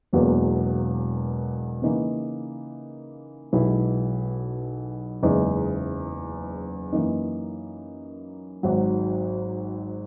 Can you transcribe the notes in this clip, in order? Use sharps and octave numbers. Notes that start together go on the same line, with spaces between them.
E1 E2 B2 F#3 A#3
C#3 E3 A#3 D#4
B1 B2 G#3 B3 E4
F#1 E2 C#3 G#3 D#4
F#2 E3 A#3 D#4
G#1 G#2 F#3